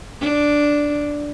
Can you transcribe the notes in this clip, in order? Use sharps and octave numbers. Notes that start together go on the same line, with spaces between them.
D4